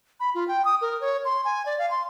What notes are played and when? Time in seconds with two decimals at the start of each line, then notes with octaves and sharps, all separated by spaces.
0.20 B5
0.35 F4
0.48 G5
0.65 D#6
0.81 A#4
1.01 C#5
1.25 C6
1.45 G#5
1.66 D5
1.79 F5
1.91 C6